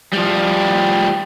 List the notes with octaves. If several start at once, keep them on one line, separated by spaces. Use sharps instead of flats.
F3 G3